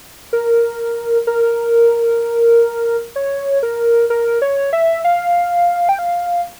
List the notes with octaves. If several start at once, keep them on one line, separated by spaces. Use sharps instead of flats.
A#4
A#4
C#5
A#4
A#4
C#5
E5
F5
G5
F5